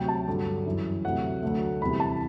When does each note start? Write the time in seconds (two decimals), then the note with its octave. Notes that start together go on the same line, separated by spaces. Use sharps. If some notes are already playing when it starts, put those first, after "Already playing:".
Already playing: D2 C3 F#3 G5
0.08 A5
0.27 G2 D3 F#3
0.66 F#2 E3 G3
1.05 D2 C3 F#3 A3 F#5
1.43 D2 D3 F#3 A3
1.81 E2 C3 E3 G3 B5
2.00 A5